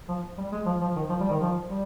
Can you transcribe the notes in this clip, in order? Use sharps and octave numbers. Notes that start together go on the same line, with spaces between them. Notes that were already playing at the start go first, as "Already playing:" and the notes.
F3
G3
G#3
F3
F3
D#3
F3
G3
D#3
F3
G3